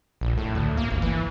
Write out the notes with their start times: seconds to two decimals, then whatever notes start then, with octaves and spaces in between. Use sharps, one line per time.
0.21 A#1
0.37 A2
0.55 D2
0.77 A#3
0.90 G1
1.02 E3